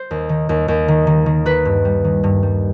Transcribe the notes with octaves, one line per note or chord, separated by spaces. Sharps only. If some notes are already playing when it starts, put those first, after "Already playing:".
Already playing: C5
D#2
D#3
D#2
D#2
D#3
D#3
D#3
D#3 B4
G2
G3
D#3
G2
G3